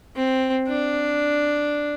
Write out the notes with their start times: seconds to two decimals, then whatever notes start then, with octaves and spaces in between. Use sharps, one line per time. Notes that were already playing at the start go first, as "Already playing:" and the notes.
0.16 C4
0.68 D4